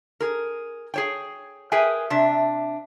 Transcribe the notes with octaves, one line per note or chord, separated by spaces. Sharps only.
G#4 A#4
G#4 C#5 G5
G#4 A#4 B4 E5 G5 G#5
C3 D4 E5